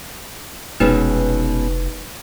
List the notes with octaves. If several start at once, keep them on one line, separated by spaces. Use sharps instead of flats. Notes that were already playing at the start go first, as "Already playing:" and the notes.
F1 B2 G#3 C#4 D#4 B4